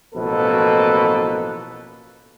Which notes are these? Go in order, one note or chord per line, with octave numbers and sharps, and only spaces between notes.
A1 B2 F3 A#3 A4 B4